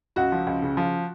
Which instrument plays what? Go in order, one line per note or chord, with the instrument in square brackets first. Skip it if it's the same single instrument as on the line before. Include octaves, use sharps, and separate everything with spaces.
[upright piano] C#2 F#4
F3
C#2
C#3
F3